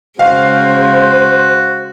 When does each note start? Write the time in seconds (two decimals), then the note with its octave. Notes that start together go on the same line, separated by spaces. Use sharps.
0.19 C#3 G#3 F#4 C5 F5